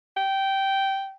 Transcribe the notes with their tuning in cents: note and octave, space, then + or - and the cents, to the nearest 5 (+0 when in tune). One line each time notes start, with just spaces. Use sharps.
G5 -10